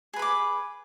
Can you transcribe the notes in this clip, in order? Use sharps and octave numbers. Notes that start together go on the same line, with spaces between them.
G#4 B4 B5 D6